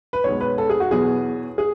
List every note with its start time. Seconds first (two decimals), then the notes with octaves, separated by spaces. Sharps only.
0.13 B4
0.24 B1 B2 G#3 C#5
0.41 B4
0.58 A4
0.70 G#4
0.80 F#4
0.91 E2 B2 F#3 G#4
1.58 G#4